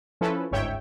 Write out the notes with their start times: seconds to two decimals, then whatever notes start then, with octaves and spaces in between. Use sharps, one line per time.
0.21 F3 C#4 E4 A4 B4
0.51 G1 C#2 G#2 C#5 E5 G5